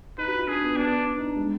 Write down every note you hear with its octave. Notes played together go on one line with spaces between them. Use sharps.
D#4 B4
F#4
F4
D4 G#4
B3
B3 D4
D4
D#4
D4
G#3